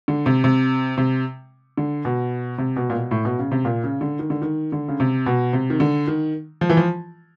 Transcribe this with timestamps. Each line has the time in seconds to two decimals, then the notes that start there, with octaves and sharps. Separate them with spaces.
0.08 D3
0.26 C3
0.44 C3
0.98 C3
1.77 D3
2.05 B2
2.58 C3
2.76 B2
2.90 A#2
2.94 B2
3.11 A2
3.25 B2
3.39 C#3
3.52 C3
3.65 A#2
3.84 C#3
4.01 D3
4.19 D#3
4.30 D3
4.42 D#3
4.72 D3
4.88 C#3
5.00 C3
5.26 B2
5.53 C3
5.70 D#3
5.80 D3
6.07 D#3
6.61 F3
6.70 E3
6.77 F3